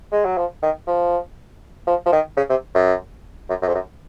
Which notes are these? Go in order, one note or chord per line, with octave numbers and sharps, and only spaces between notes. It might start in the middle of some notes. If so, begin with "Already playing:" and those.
G#3
F#3
F3
D#3
F3
F3
F3
D#3
C#3
C3
F#2
F#2
F#2
F2
F#2